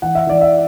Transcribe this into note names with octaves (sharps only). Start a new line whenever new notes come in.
E3 F#5
E5
E3 D5
E5